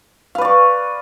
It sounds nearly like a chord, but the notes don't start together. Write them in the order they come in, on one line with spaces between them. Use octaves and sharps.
F5 B4 D5 C#6